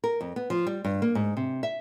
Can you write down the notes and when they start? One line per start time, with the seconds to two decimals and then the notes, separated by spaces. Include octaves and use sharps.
0.04 A#4
0.21 F2
0.36 B3
0.50 F3
0.67 G3
0.84 G2
1.02 A#3
1.15 G#2
1.37 C3
1.63 E5